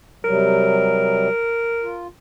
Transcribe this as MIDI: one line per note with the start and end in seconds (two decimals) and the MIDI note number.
0.25 1.28 48
0.25 1.28 54
0.25 1.28 55
0.25 2.07 70
1.82 2.07 65